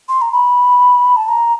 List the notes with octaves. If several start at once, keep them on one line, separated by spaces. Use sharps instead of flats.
C6
A#5
B5
A5
A#5